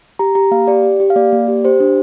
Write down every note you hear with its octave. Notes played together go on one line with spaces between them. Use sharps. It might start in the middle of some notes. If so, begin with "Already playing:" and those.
G4 A#5
G4 A#5
A#3 F5
G4 D5
G4
G4
F5
A#3 D5
A#3
G4
G4 C5
D4